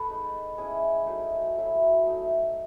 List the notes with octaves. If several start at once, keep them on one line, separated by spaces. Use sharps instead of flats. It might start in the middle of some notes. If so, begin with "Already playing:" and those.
Already playing: A4 B4
G#3 D#4
G#3 C#4 E4 G#4
F#3 A3 D#4
F#3 A3 E4
F#3 A3 D#4